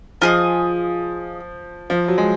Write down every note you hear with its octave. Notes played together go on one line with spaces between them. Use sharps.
F3 F4 G#4 D#5
F3
F#3
G#3